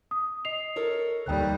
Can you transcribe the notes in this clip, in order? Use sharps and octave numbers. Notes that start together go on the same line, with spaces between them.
D#6
D#5 C7 F7
A4 A#4 C#5
D#2 G3 G5 F#6